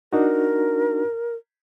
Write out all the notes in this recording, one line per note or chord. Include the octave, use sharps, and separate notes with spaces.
D4 D#4 F#4 A#4